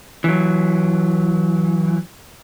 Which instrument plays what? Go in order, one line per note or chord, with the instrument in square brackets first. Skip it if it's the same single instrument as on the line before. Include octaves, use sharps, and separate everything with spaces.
[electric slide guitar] E3 F#3